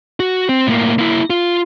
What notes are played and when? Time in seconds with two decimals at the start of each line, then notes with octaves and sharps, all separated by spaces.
0.20 F#4
0.49 C4
0.67 A2 A#3
0.99 A#3 E4
1.30 F4